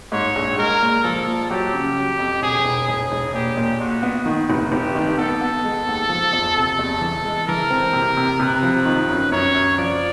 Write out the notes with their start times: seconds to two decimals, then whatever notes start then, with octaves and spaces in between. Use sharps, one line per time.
0.12 G#2 C#5
0.35 A#1
0.58 G#3 A#4
0.82 A#2
1.04 F3 A4
1.27 A#2
1.50 F#3 G4
1.73 C#3
1.97 F#3
2.19 F2
2.42 E1 G#4
2.65 E1
2.88 E1 G#4
3.12 E1
3.34 A#2 G4
3.57 A#2
3.80 A#2 F#4
4.03 B3
4.26 D#3
4.50 F1
4.72 F1 G4
4.95 D#3
5.18 B3 A4
5.41 B3
5.64 G#3
5.87 D#2
6.09 F3
6.33 E2
6.56 C3 A4
6.79 E2
7.01 E3
7.25 G#3
7.48 E3 A#4
7.70 C4
7.93 C3
8.17 C3
8.40 C3 B4
8.63 F3
8.85 D#3
9.08 F#2
9.32 F#2 C#5
9.54 F#2
9.78 F3 D5